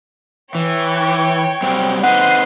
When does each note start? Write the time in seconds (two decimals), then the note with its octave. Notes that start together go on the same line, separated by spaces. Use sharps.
0.55 E3 C#5 G5
1.62 F#3 G3 C4
2.03 C4 D#4 B4 F#5 C6 D#7